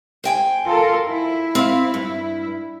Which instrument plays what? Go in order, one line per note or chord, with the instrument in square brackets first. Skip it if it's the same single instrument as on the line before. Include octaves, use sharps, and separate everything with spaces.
[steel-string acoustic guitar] C5 G5 G#5
[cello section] F4 A4 A#4
E4
[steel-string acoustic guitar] C4 F5
G2